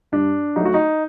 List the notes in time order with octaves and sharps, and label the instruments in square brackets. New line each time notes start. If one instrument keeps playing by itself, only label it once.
[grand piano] G2 D4
F#3 A3 D#4
F#4
D#4